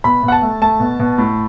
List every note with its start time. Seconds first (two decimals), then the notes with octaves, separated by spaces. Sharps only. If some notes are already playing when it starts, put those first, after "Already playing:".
0.04 B2 B5
0.23 B2
0.28 F#5
0.32 A5
0.42 A3
0.62 A3 A5
0.80 B2
0.99 B2
1.18 A2